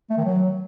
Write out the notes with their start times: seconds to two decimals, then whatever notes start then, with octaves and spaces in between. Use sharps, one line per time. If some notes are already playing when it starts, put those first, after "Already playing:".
0.10 A3
0.17 D#3
0.25 F#3